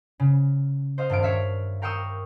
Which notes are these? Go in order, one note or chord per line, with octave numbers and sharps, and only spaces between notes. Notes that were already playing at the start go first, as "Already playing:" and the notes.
C#3
C5 D#5 F5
D#1 G2 F5 D7
C#5 E5 F5
A#4 F5 G5 C#6 D#6 E6